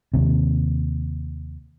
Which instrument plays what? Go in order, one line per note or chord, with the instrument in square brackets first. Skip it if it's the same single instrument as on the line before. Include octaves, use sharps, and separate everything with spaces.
[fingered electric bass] D#2 C3